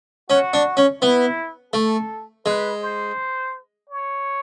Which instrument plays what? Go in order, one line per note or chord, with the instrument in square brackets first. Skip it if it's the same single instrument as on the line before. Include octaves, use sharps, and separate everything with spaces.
[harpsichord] C#4 [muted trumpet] F#4
[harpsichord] D4
C#4
[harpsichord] B3 [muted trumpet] E4
[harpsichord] A3 [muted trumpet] A4
[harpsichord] G#3 [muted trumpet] B4
[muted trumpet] C5
C#5